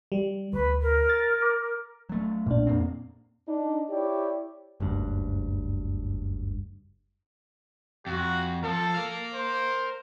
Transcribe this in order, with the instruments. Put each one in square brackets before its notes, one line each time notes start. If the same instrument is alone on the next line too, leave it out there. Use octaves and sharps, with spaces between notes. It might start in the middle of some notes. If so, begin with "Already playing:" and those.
[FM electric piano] G3
[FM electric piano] D2 [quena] B4
[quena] A#4
[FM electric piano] A6
D6
[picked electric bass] F#3 A3
[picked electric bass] B1 [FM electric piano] A#2 D4
[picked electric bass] F2 A#3 C4
[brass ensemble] D4 D#4
E4 G4 C#5 D5
[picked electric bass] F#1 D2 G2
[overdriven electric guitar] F2 [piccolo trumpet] F#4
[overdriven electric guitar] F3 [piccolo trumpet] A4
[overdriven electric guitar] A#4 F5
[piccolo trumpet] C5